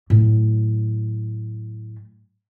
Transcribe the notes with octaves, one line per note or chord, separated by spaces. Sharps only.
A2 F#3